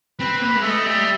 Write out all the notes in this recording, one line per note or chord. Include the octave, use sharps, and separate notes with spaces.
C4 B4
A#3 B4
G#3 B4
A3 E5
D#5
G3 E5